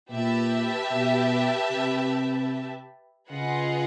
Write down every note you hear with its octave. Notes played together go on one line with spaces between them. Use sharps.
A#2 G4 B4 E5 A5
B2
C3
C#3 F4 G#4 B4 D#5 F#5